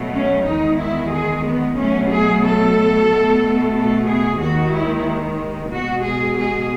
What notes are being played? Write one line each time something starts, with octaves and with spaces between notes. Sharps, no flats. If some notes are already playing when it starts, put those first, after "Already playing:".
Already playing: B2 F#3 A3
C#4
E2 D#3 G#3 D#4
E4
G#4
B3
B2 F#3 A3 C#4
G#4
A4
B2 A3
A4
G#4
D#2 D#3 G#3 F#4
E4
B2 G#3 F#4
G#4
G#4